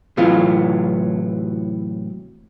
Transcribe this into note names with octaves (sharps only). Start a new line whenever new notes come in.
A2 C3 E3 F#3 F4